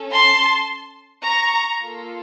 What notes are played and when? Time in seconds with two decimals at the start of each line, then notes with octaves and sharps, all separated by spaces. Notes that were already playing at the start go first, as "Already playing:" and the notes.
Already playing: C#4 A4
0.11 A5 C6
1.24 A#5 C#6
1.80 A#3 F4 A4